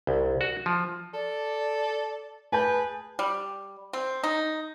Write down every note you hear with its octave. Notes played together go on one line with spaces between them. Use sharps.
C2
F#4
F3
A4 D5
G#4 B4 G#5 A5 G6
G3
C4
D#4